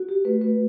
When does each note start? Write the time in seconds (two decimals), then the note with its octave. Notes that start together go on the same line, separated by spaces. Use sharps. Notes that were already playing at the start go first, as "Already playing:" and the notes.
Already playing: F#4
0.09 G4
0.25 A3 B4
0.41 B4